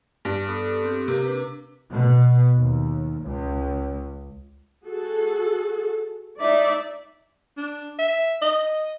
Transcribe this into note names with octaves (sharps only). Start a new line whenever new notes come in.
G2
B3 A4 D#6
C4 G4
C3 A#3 G4
D4 B4
B2
D#2
C#2
F#4 G#4 A4
D#4 D5 E5
D4
E5
D#5